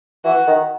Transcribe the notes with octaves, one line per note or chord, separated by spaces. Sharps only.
E3 F#4
D#3